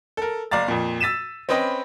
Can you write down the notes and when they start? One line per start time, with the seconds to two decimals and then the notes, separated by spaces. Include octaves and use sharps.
0.17 A4 A#4
0.51 F#1 D5 F5 A#5 A6
0.68 F2 A#2
1.00 E6 A6 B6 D#7 E7
1.49 C4 C#4 B4 D#5 G5 B5